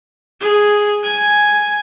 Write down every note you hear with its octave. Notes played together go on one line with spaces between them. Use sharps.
G#4
G#5